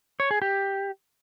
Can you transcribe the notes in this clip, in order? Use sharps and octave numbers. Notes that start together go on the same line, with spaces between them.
C#5
G#4
G4